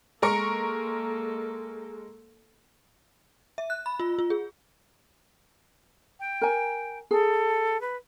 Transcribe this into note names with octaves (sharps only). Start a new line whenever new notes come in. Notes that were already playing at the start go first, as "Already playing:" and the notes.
G#3 A#3 A4 A#4 C#6
E5
F#6
B5
F4
F4
G#4
G5
A#4 G#5
G#4 A4
B4